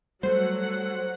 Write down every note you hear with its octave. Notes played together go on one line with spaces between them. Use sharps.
F#3 G3 A3 A4 C5 F#5